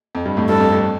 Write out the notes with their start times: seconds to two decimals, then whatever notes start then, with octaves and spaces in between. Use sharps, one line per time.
0.15 F2
0.25 G2
0.37 F2 A2
0.49 G2 A4
0.60 F2
0.72 F2